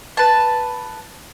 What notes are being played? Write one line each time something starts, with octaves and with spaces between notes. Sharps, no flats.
B4 A5